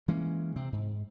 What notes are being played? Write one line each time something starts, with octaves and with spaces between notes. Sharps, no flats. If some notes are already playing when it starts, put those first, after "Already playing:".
E3 G#3 A#3 C#4
C3 C4
G#2